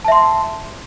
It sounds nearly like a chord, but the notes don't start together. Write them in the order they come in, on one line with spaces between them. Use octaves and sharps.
A5 E5 C6